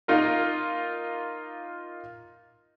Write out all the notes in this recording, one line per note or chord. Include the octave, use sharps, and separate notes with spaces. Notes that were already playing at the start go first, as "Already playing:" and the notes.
A#3 D#4 F4 A#4